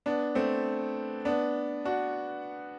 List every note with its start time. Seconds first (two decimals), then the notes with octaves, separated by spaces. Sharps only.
0.06 B3 D4
0.35 A3 C4
1.25 B3 D4
1.85 D4 F#4